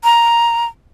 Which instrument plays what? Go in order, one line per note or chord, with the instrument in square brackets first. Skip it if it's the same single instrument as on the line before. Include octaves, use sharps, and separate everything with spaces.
[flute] A#5